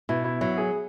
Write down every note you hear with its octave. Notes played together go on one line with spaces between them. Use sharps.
B2 E4
E4
F#3 E4
G#4